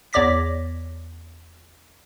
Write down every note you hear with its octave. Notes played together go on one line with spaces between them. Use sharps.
E2 C#5 D5 D6 A#6 B6